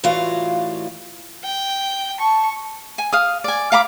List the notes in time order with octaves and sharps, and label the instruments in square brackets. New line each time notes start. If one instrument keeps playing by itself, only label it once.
[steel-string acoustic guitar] A2 E3 G3 F4 F#4 F5
[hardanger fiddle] G5
[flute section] A5 [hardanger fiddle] C#6
[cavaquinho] G#5
F5 D#6
D5 G#5
F5 A#5 B5 D6